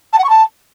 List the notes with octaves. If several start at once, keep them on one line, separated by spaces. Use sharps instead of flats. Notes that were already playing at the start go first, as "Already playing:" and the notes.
A5
F#5
C#6
A5